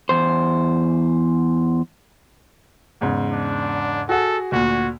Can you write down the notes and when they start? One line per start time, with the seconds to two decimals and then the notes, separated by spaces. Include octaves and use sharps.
0.09 E2 C5
3.01 E2 G#2 C#3
3.31 D4
4.09 F#4 G#4 A4 F#5
4.52 D2 A#2 F#4